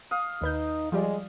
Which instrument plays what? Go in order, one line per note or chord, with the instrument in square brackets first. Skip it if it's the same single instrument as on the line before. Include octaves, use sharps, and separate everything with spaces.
[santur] F5 D#6
[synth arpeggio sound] D#2 B4 G6 [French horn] D#4
[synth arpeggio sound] F3 G3 D5 [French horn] G#3